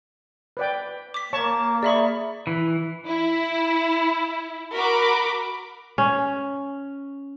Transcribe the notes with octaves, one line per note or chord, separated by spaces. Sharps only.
B4 D5 G5
D6 B6
A#3 C#5 A5 C#6
G#4 D5 E5 A#5 B5 C#6
E3
E4
F#4 A#4 B5 D6
C#4